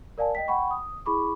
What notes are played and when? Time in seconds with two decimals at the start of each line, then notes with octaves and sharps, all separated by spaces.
0.18 A#4 D5 F5 G#5 A5
0.35 D#5 G5 B6
0.48 F#5 G5 B5 C#6
0.71 D#6
1.06 E4 G#4 B5 C#6 D6